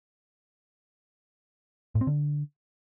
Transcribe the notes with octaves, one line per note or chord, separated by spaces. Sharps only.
A2
C4
D3